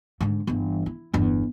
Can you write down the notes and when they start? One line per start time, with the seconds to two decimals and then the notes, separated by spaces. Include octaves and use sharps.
0.21 G#2 D3
0.47 G1 E3
0.86 E4
1.13 G1 E2